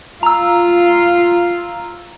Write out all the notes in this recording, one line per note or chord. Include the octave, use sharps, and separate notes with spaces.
F4 A#5 E6